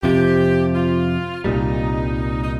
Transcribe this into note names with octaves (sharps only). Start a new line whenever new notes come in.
F2 C3 F3 G4
F4
C2 A#2 G3 D#4
D#4